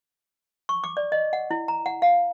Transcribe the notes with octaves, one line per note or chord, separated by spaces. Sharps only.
C#6
D6
D5
D#5
F#5
E4
A#5
F#5
F5